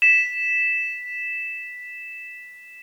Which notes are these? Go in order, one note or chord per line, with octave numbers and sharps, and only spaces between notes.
B6 E7